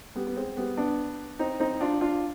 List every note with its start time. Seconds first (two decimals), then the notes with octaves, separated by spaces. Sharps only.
0.15 G3 B3
0.27 B3
0.36 G#3 C4
0.57 G3 B3
0.77 B3 D4
1.39 C4 D#4
1.60 C4 D#4
1.81 D4 F4
2.01 D4 F4